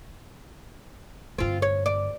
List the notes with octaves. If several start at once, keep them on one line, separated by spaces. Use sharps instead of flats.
G2 D3 C4 F4
C#5
D5